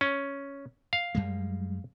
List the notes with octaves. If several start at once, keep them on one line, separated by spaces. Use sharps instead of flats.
C#4
F5
F#2 G3 G#3